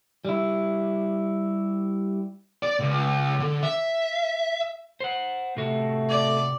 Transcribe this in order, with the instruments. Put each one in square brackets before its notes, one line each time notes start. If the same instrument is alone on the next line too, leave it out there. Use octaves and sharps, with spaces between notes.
[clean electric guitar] G3 E4
[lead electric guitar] D5
C#2
D3
E5
C5 F#5
[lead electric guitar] C3 F#4 [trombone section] A3
[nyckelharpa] D5